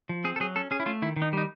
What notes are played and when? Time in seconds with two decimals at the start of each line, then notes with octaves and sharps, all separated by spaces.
0.09 F3
0.24 C4 G#4
0.36 A4
0.40 F#3 G#4
0.56 C#4 A4
0.71 C#4 G#4
0.80 E4
0.86 A3 F4
1.02 D#3 E4
1.16 D#3
1.22 D#4
1.33 G3 D#4